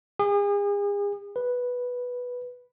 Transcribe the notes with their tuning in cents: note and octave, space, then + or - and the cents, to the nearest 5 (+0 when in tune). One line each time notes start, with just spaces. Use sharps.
G#4 -40
B4 -5